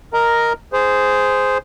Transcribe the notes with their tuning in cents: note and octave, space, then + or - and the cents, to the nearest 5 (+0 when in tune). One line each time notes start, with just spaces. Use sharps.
A#4 +0 D#5 +0 A#5 +0
G#4 +0 C5 -10